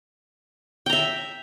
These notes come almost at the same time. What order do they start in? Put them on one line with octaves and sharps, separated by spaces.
G5 A#5 E5